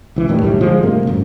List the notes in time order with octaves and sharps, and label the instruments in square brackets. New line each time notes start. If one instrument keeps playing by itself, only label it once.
[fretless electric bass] C#2 E3
F2 A2 D#3 G3
D1 B1 A2 G3
D3 F3 G#3
G2 C3 A3 A#3
G#1 F#2